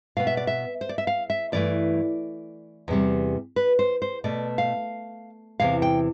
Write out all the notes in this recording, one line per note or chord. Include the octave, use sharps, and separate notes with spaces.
B2 B3 F5
E5
D5
E5
C5
D5
E5
F5
E5
G2 E3 A3 D5
E2 C3 G3
B4
C5
C5
B2 A3 D5
F5
E2 C3 E3 F5
G5